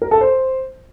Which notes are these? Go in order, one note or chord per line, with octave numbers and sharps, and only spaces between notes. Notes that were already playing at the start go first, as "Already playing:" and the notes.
A#4
A4
C5